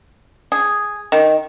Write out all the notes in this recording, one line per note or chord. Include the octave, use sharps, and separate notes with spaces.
G#4
D#3